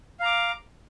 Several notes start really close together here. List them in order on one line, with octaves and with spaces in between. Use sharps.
F5 A#5 D6